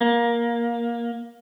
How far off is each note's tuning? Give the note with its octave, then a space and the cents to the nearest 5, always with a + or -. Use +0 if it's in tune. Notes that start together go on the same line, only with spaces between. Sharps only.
A#3 +15